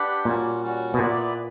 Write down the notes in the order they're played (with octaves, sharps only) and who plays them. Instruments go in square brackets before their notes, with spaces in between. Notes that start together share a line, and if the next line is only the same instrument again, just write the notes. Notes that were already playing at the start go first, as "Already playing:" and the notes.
Already playing: [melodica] D4 G4 B4 F#5
[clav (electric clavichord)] A#2 [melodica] G3 C#4 F#4
[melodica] G3 C#4 F#4
[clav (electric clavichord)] B2
[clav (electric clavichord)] A#2 [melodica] B3 E4 B4 D5